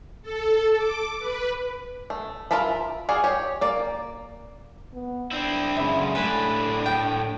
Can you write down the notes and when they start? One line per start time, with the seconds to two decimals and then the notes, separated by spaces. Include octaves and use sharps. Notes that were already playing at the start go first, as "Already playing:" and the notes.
0.22 A4
0.76 D6
1.19 B4
2.10 A3
2.51 F4 A#4 E5 A5 B5
3.09 F#4 G#4 D5 F5
3.24 G4 C#5
3.61 A#3 D5
4.93 B3
5.31 C4 D4 E4
5.77 F#2 C#3 G#3 E4
6.15 A2 A3 D4 B4 G#5
6.86 G5